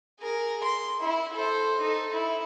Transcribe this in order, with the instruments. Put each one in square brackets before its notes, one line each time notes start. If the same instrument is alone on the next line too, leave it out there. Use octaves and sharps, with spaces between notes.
[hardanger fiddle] G#4 A#4
C6
E4
A4 C5
D#4 A4
E4